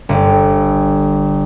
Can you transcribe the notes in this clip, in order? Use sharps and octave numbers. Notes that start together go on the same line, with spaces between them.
G1